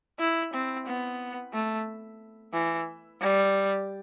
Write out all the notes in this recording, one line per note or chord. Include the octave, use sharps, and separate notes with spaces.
E4
C4
B3
A3
E3
G3